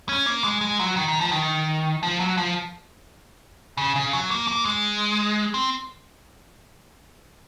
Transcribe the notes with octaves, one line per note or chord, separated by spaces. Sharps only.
C#4
A#3
G#3
G#3
F#3
D#3
D#3
F3
D#3
F3
F#3
F3
C#3
C#3
F#3
A#3
A#3
G#3
C4